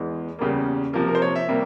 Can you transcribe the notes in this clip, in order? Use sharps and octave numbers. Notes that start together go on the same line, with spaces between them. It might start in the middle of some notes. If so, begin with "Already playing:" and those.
Already playing: E2 E3 G#3
E2 C#3 G3 A#3
C3 F3 A#3 A#4
A#4
C5
C#5
E5
C3 G3 A#3